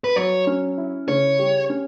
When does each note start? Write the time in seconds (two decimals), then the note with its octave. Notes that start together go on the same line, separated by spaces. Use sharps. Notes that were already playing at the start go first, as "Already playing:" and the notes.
0.04 B4
0.16 F#3 C#5
0.47 C#4
0.78 E4
1.08 C#3 C#5
1.39 G3
1.70 C#4